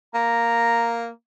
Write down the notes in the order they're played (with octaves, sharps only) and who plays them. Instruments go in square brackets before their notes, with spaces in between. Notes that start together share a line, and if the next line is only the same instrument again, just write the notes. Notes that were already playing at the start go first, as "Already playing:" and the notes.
[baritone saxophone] A#3 [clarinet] A#5